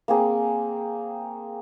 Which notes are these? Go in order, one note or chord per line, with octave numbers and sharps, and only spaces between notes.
A#3 C4 G#4